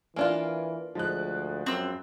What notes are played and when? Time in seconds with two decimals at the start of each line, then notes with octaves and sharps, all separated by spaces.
0.16 E3 A#3 D4 F4 G#5
0.95 D2 F3 G#3 F#6
1.66 F#2 C4 E6